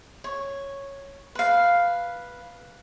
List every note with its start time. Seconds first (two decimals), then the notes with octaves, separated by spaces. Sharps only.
0.24 C#5
1.35 B4 F5